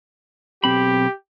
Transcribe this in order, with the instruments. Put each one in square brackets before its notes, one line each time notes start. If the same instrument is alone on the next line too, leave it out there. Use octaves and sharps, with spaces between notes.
[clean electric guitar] B1 C4 B5 [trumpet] G4